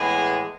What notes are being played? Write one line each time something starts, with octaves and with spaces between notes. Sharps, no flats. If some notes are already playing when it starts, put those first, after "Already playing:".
Already playing: A2 E3 G#3 B3 G#4